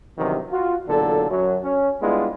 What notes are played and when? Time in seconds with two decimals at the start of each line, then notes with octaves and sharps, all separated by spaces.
0.18 E2 G2 C3 D#3 E3 F#3
0.51 F4 F#4
0.88 B1 E2 A#2 D3 F#3 A4
1.30 F#2 F#3
1.64 C#4
2.02 G3 G#3 B3 D4 E4 F4